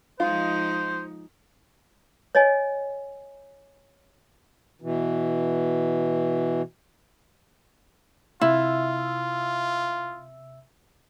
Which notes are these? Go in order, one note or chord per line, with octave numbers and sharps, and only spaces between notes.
F3 G#3 D#4 F4 C5
C#5 D#5 G#5
B2 E3
C3 E4 F4 E5 E6